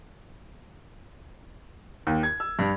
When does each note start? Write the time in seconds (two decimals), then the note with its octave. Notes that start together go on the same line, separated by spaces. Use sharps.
2.07 D#2
2.23 G#6
2.40 E6
2.59 G2